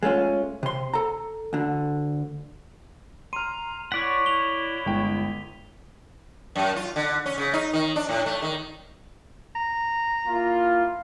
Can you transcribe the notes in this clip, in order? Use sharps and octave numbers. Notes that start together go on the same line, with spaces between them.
G#3 A3 C#4 F4
C3 C6
A4 A#5
D2 D3
A#5 C6 F6 D#7
E4 C#5 D5 F#5 B6
E4 F7 G7
G1 G#3 G5
F#2
F4
D3
C#4
C#3
D#4
D#3
D4
A2
A3
D#3
A#5
A#3 E4 F4